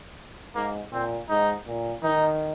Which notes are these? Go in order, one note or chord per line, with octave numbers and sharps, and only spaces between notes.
G#2 A#3
A#2 C4
G#2 D#4
A#2
D#3 D#4